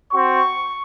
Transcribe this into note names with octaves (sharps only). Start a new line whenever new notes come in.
C4 F#4 C#6